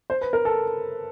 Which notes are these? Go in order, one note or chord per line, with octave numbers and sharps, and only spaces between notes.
C5
B4
A#4
A4